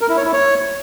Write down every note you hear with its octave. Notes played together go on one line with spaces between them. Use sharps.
A#4
E4
C#5
E4
C#5